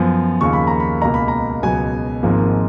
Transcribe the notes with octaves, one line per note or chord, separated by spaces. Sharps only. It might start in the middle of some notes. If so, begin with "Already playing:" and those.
Already playing: F#2 F3 B3
D#2 C#3 F3 A#3 C#6
B5
A#5
B5
C#2 B2 A#3 A#5
B5
A#5
C#2 B2 F#3 B3 G#5
G#1 G#2 F3 A#3